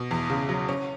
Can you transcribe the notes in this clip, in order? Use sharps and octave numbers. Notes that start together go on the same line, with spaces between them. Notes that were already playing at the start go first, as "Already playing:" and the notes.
Already playing: B2
E2
C#3
F#3
C#4